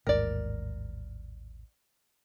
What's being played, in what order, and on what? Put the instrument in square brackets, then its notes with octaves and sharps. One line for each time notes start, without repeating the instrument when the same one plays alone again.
[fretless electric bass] A1 D#2 G#2 [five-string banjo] A#4 D5